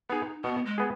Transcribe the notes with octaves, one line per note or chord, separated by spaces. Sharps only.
B3 D#4 G#4
B2 B3
G#3
B3 G#4